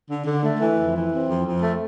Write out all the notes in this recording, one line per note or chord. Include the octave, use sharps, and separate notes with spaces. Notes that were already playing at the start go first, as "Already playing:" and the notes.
D3
D3
A3
E3
F2
E3
C4
F2
F2
A3